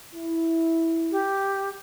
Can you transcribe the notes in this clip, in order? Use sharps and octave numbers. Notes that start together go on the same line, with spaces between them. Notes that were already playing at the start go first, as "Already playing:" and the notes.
E4
G4